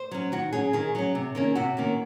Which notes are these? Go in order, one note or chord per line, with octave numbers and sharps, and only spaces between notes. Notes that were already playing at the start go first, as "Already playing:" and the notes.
Already playing: C5
F#3 C#4
D#3 F#4
F#3 C#4 G#4
D#3 G#4
F#3 C#4
C3
D#3 A#3 C#4
C3 F#4
D#3 A#3 C#4